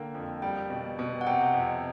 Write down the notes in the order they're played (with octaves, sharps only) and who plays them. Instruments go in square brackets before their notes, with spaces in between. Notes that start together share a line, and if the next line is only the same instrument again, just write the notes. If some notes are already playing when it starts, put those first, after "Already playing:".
Already playing: [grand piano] D3 A#3 [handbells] G5
[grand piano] F2
[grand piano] G3 [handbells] G5
[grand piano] B2
B2
[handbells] F#5
[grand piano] C3 [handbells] G5
[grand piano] F2